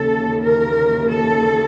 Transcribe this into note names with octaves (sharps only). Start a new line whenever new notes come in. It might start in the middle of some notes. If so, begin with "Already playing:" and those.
Already playing: D#2 C#3 E3 A4
A#4
A4